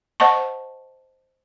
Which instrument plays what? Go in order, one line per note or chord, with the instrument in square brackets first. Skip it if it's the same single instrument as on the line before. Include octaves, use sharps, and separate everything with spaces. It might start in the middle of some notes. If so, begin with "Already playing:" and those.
[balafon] C5 D#5 F#5 A5 C#6